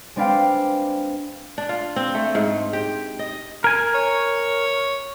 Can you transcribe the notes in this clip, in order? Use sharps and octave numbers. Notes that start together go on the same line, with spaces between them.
G#3 C4 D4 B4 F5 G5
D4
F4
C4
A3
G#2
G4
D#5
A#4 G#5
C#5